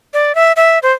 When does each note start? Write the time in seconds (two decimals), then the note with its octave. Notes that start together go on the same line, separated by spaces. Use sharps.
0.14 D5
0.35 E5
0.56 E5
0.83 C5